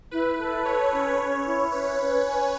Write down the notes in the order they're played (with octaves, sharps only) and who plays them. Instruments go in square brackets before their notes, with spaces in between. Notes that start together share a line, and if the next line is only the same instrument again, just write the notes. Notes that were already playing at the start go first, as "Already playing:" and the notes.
[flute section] E4 [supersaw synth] B4
[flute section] A4
[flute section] A4 [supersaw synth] C#5
[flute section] C#4
C#4
E4
[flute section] C#4 [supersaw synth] B4
[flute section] C#4
G#5